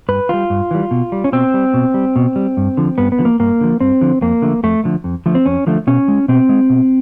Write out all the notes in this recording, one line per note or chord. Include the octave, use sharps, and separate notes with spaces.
G2 B4
E3 G3 F4
G2
E3 G3
B2
G3
C#4
B2 C4
G3
B2
G3
B2
G3
G2
D3 F3
G2 B3
B3
D3 F3
A#3
G2 A#3
D3 F3
G2 C4
D3 F3
F2 A#3
D3 F3 A3
F2 A3
D3 F3 A3
F2
D3 F3 A3
C4
F2 C#4
D3 F3 A3
B2 C#4
G#3
B2 C4
G#3
B2